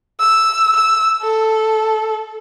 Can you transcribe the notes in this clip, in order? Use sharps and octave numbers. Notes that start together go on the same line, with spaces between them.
E6
E6
A4